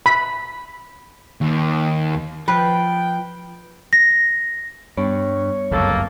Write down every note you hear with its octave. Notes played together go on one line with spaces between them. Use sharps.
B5
D#2
F3 B4 G5
A#6
G2 G3 B3 C#5
G1 C#2 F#2 A#3 A4